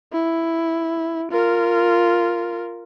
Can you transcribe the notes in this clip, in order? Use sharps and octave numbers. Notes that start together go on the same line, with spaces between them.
E4
F4 A#4